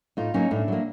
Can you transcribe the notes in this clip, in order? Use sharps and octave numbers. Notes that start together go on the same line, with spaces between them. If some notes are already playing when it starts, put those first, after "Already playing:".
A2 D#4 F4
F#3 A#3 C#4 D#4
A2 D4 E4
F#3 A#3